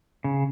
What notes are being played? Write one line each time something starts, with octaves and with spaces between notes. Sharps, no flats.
C#3